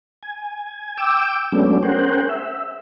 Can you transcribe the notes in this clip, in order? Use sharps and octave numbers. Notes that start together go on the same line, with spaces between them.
G#5
G5 D6 E6
F#3 G#3 A3 B3 C#4 D4
C#4 G#4 A#4 C5 F#5 G5
E5